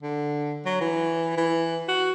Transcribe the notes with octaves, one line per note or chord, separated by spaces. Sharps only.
D3
F#3
E3
E3
F#4